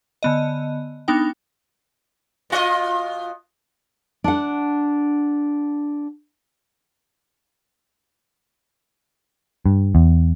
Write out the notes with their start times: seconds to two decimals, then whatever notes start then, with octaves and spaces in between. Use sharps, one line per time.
0.23 D3 B3 D#5
1.08 B3 D4 D#4 G5
2.50 B2 F4 D#5
4.24 D4 F#5
9.66 G2
9.95 E2